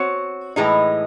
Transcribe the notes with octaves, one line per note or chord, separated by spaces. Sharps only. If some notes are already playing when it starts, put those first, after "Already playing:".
Already playing: C4 F#4 C#5
A2 E3 G#3 D#4